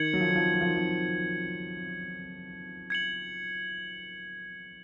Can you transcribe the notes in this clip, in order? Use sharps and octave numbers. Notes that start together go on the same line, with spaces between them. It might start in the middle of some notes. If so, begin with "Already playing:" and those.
Already playing: D#3 G#6 C#7 F#7
F#3
F3
D#3
F3
F#3
F3
D#3
F3
G#6 C#7 F#7